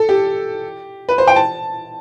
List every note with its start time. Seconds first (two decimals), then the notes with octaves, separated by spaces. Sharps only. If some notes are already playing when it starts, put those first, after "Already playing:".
Already playing: A4
0.09 G4
1.09 B4
1.18 C5
1.28 G5
1.36 A5